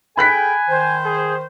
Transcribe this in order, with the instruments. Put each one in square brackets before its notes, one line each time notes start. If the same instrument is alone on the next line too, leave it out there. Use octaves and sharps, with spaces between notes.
[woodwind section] G#4 A4 G5 [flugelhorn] G#5 [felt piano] B5 F#6 B6
[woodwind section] D#3 C5
[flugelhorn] G#4